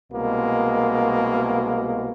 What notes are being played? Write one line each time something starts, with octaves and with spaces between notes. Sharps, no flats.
C2 B2 G#3 A#3